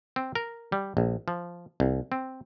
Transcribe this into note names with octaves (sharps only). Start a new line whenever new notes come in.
C4
A#4
G3
A#1
F3
C2
C4